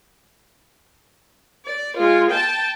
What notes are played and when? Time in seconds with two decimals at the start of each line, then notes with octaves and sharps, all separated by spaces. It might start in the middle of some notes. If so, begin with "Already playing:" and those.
1.66 D5
1.97 G#3 F4
2.31 G5 A5